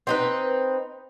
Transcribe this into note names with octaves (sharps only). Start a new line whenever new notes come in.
C4 D#4 B4